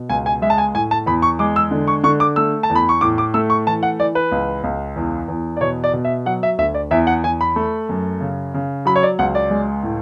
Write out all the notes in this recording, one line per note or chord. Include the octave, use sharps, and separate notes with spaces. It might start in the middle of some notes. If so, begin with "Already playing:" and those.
Already playing: B2
C#2 G#5
G#5
G#3 E5
A5
G#5
A2 G#5
A5
E2 B5
C#6
G#3 D6
E6
D3
C#6
D3 C#6
D6
A3 E6
A5
E2
B5
C#6
A2 D6
D6
A3 E6
C#6
E3 A5
F#5
E3 D5
B4
C#2
C#2
E2
E2
D5
B2 C#5
D5
B2
E5
F#3 F#5
E5
D2 E5
D5
E2 E5
F#5
E2 G#5
B5
A3
F#2
C#3
C#3
F#3 B5
C#5
D5
C#2 F#5
D5
G#3
A2